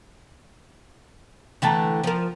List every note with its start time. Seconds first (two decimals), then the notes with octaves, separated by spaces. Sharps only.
1.62 D3 E3 A3 G5 A5 A#5
2.04 F3 A#4